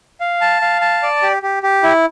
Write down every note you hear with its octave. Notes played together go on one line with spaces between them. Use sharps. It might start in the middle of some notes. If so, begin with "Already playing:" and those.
F5
A5
F5
A5
D5
G4
G4
G4
E4